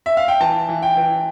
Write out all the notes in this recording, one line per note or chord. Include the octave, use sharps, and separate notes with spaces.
E5
F5
G5
E3 A5
E3
G5
E3